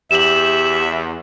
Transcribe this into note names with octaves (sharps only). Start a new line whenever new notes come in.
E2 G4 E5 E7 F#7